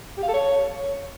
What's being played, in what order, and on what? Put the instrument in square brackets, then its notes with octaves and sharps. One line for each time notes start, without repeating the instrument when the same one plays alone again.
[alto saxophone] G4
F5
A4
C#5